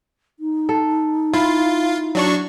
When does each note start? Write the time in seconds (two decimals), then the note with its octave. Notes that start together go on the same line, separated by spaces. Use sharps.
0.40 D#4
0.69 A4
1.33 E4 F4
2.15 F#3 D4 C#6